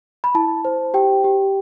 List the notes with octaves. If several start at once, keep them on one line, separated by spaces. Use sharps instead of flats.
B5
E4 A5
C5
G4 G5
G4